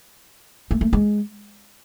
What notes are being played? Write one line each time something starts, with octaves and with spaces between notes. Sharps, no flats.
A3
A3
G#3